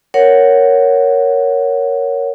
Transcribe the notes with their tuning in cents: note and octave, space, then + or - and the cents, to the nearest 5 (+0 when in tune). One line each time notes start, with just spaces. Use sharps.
A#4 +0 C#5 +5 F#5 +0